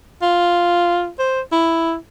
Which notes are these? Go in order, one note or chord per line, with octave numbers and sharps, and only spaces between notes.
F4
C5
E4